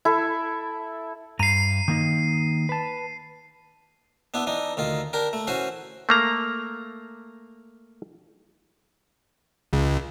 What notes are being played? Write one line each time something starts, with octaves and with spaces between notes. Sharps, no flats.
E4 A4
G2 A#5 C7 D#7
D#3 A#3 D#4
B4 A5
B3 D4 E4
E3 D4 D#4
D2 D#3 F4
D4 G4 A#4
A3
E3 C#4 F#4 C5
A3 A#3 A#5
C#2